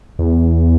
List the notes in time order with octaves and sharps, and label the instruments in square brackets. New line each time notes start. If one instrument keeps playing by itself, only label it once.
[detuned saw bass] E2